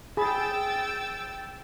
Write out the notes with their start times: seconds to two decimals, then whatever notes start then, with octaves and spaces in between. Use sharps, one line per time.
0.17 G#4 G5 B5 E6 A6